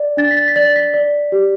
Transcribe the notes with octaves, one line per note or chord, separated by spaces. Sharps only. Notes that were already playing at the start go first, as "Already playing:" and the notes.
Already playing: D5
D4 A6
B6
A6
B6
D5 A6
B6
D5
G4